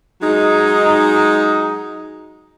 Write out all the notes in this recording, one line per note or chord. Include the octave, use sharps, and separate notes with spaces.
F#3 G#3 D#4